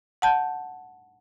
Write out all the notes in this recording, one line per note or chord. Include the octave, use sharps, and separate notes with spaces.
F#5 A5 G6